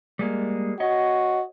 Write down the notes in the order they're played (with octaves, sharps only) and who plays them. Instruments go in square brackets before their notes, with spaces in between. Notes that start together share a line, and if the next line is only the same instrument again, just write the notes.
[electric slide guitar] G3 G#3 A#3
[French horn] F#4 [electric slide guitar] C#5 D#5